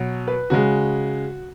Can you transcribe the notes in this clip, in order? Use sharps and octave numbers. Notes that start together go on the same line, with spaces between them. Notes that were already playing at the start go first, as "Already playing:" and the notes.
Already playing: B2 F#3
B4
C#3 G#3 F#4